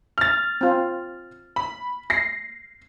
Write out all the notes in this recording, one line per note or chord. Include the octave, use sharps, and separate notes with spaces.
F6 A6
C4 F4
B5
A#6 C7